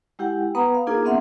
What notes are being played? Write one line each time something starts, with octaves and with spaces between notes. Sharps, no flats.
G#3 E4 G4 F#5 G5
B3 B4 F#5 A#5 B5 D#6
F5
A#3 D4 D#4 F4 G#4 A#4
A#3 B3 C#4 E5 F#5 C6